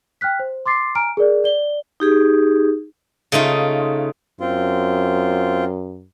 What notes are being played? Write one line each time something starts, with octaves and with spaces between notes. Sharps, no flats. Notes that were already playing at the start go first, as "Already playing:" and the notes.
G5 F6 F#6 B6
C5
C6 D6 A6 C7
G#5 A#5 F6 D7
G#4 A#4 D5
D5 G7
D#4 G4 G#4
C#3 A3 D#4 F4
F#2 C4 F4